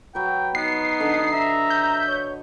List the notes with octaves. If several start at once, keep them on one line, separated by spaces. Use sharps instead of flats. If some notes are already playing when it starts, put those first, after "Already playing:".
F#3 B4 G5
B3 D#4 C7
D3 D#5
E5 A#5
G6
C#5